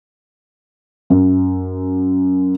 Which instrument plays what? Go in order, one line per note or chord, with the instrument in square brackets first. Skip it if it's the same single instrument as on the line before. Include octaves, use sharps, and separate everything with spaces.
[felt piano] F#2